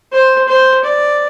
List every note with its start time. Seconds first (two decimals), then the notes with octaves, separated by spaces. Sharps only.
0.12 C5
0.48 C5
0.84 D5